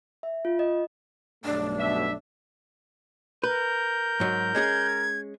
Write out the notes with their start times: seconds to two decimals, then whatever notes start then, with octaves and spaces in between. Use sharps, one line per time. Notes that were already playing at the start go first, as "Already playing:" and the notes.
0.23 E5
0.45 F4
0.59 D#5
1.44 B1 G2 A3 D4
1.78 B2 E5
3.44 A#4 B4 G6
4.20 G#2 F#3
4.55 G#3 C#4 G#4 G#6